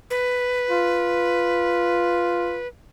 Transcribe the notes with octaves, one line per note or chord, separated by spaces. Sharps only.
B4
F4